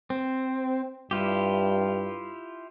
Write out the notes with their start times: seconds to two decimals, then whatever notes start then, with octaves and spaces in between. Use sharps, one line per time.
0.10 C4
1.11 G2 E4 F4 G4